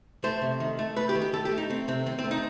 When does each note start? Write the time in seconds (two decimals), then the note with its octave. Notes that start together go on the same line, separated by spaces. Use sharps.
0.24 A3 C5
0.42 C3
0.60 D#3
0.79 A3
0.96 A3 B4
1.09 G4
1.15 D#3
1.22 G4
1.33 D#3 A4
1.45 G4
1.51 A3
1.58 D#4
1.70 A3 C4
1.88 C3 C4
2.06 D#3 C4
2.19 C4
2.24 A3
2.31 D#4